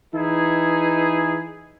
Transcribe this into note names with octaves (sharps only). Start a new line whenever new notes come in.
E3 D#4 E4 G#4